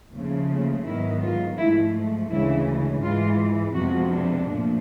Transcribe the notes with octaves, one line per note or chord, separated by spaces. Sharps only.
D#2 C#3 F3 A3
G#2 D#3 F#3 B3 E4
F4
G#2 F3 A3 E4
D2 C#3 E3 G#3 E4
G#2 E3 G#3 F4
F2 C3 F3 G#3 B3 F#4
D4
A#2 F3 A3